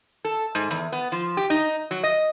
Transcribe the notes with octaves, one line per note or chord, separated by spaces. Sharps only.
A4
G#2
E2
B3
F3
G4
D#4
F#3
D#5